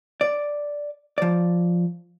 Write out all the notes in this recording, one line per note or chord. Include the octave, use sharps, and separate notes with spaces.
D5
F3 D5